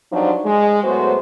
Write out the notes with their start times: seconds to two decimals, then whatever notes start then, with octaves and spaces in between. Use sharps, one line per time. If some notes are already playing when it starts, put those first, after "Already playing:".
0.12 G2 F3 F#3 C4 D4 D#4
0.45 G#3
0.84 A2 F#3 B3 F#4 C5